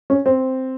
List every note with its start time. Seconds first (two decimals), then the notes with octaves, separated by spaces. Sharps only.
0.10 C#4
0.26 C4